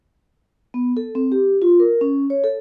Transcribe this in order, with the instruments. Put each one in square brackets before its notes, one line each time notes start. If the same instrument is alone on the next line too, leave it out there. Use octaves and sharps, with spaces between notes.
[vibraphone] B3
A4
C4
G4
F4
A#4
C#4
C#5
A4